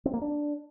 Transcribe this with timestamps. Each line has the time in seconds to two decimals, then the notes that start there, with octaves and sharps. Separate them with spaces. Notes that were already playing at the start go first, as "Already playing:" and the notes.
0.05 C4
0.13 A#3
0.21 D4